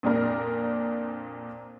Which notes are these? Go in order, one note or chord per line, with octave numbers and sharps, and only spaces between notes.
F2 A#2 D4 A#4